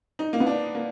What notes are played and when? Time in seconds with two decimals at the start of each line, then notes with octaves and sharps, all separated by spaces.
0.19 D#4
0.33 A#3
0.40 B3
0.47 D4
0.75 A#3